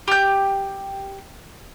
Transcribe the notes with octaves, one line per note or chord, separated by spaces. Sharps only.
G4 G6